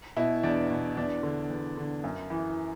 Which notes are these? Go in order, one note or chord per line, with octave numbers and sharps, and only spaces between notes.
B2 E4
E2 D4
B2
E2 D4
D3
E2
D3
F#2
E3